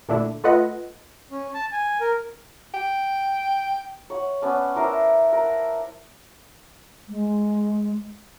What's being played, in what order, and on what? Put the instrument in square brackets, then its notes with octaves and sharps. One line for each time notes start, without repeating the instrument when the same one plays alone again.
[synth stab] A#2 D3 A3 D4 E4
A3 F4 A4 B4 D#5 F#5
[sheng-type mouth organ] C#4
A5
G#5
A#4
[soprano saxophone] G5
[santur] C#5 F#5
B3 C#4 D4
D4 E4 A#4 C5
A#4 F#5
[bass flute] G#3